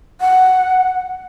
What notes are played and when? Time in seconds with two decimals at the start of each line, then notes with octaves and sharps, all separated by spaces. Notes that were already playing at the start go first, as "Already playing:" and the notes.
0.21 F#5